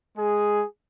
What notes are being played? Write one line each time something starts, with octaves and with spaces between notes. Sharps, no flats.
G#3 G#4